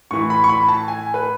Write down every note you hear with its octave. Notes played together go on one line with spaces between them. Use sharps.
A2 E3 C#6
B5
C#6
B5
A5
G#5
B4